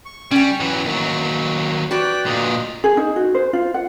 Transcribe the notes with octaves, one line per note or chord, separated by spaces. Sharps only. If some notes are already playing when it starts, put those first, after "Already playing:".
C#6
G3 C#4 G5
E3 F#3
D#2 F#3
F#4 G4 B4 D5 G5 F#6
A#2 D3 D#5 A#5
G#4
D#4
F#4
C5
F4
F#5